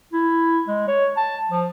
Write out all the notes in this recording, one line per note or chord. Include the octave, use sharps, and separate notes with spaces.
E4
G#3
C#5
A5
F3